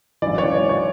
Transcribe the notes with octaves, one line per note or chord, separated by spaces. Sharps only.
G#1 F#2 E3 D5
C#5
D5
C#5